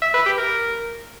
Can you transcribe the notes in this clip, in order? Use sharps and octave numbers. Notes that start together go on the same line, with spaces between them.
E5
B4
G4
A#4